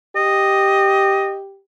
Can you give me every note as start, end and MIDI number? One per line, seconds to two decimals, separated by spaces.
0.16 1.60 67
0.16 1.37 75